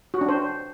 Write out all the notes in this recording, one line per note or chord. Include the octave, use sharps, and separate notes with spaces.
F#4
D4
C5